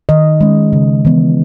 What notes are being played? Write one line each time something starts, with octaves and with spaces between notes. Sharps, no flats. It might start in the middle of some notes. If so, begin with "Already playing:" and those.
D#3 D#5
G#3 C#4
C#3
E3 B3